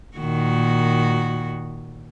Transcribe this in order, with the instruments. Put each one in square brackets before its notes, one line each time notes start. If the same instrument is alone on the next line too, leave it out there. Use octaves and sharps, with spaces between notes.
[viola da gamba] A#2 D#3 F#4